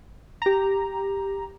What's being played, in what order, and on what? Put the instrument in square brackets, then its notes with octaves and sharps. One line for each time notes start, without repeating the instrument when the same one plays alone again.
[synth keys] G4 A#5